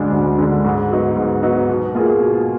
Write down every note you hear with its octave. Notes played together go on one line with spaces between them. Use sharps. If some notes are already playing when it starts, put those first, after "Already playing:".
Already playing: D2 D3 G#3 D4
D2
D3 G#3 D4
G#2
F#3 B3 D#4
G#2
F#3 B3 D#4
B2
A#3 F4 G#4
B2